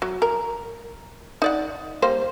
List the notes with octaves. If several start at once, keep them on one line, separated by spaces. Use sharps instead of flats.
F#3
A#4
D#4 D5 F#5
G3 A#3 C5